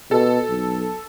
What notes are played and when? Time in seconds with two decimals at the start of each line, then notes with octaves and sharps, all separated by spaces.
0.11 B2 A4
0.49 B1